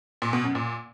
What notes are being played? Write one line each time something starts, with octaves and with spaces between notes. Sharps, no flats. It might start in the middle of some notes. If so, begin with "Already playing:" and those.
A#2
B2
F#2
A#2